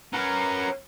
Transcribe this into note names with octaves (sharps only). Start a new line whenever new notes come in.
C#4 A#4 B4 F#5 A#5